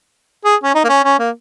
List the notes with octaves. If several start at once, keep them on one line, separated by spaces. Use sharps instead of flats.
G#4
C#4
D#4
A#3
C#4
C#4
A#3